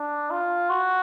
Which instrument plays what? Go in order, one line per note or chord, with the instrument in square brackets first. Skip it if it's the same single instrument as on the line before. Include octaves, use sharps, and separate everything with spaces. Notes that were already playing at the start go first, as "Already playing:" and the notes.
Already playing: [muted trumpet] D4
F4
F#4